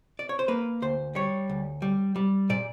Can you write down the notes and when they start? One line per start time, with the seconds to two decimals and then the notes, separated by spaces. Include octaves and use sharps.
0.19 D5
0.29 C#5
0.39 C5
0.48 A#3 B4
0.82 D2 C5
1.15 G3 C#5
1.50 D2
1.82 G3
2.16 G3
2.50 A#2 D5